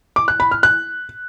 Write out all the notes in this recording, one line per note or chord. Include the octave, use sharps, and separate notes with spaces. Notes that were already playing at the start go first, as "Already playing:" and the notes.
D6
F#6
B5
F6
F#6